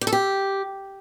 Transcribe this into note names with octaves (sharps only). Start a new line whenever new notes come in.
G4
A4
G4